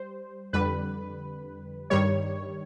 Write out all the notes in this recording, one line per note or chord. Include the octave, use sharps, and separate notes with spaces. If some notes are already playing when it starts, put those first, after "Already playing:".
Already playing: G3 C5
F2 D3 G3 B4
G2 D#3 G3 C#5